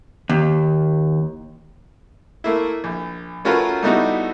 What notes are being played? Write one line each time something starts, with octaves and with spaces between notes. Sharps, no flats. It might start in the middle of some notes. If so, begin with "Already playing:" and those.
D#2
A3 A#3 E4
A#1
A3 C#4 F4 F#4 A#4 B4
G3 A3 B3 D#4 E4 F#4